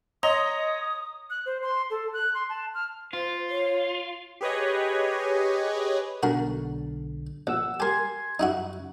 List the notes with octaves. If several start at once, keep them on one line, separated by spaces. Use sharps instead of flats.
C#5 D#5 A#5 C6 D#6
F#6
C5
C6
A4
F#6
C6
A5
F6
F4 C5
C#5
G4 G#4 B4 C#5 D#5
B1 D3 F#4 A#4
A#1 F#5 E6
G4 A#4 G#5 C6 G#6
F#2 D#4 E4 F#4